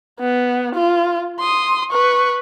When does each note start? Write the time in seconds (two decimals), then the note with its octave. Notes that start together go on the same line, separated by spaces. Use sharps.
0.19 B3
0.75 F4
1.39 C6 D#6
1.91 B4 C#6